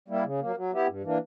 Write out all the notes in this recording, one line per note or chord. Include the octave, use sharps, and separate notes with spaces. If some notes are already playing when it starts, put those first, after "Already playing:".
G3 A#3 E4
C#3
F#3 A#3
F#3
B3 E4 G4
G2
E3 A#3 D4